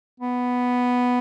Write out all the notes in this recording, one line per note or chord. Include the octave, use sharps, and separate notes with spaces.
B3